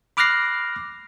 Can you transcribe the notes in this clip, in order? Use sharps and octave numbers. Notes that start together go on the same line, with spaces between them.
B5 D6 F6 F#6 A#6 C7